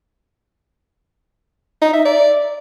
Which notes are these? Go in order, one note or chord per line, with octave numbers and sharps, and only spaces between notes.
D#4
E5
D5